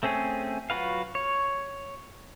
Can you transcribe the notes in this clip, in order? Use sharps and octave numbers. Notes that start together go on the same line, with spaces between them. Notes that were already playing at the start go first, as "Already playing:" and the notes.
A3 C4 C#4 G#4
F#3 F4 F#4 B4 F5
C#5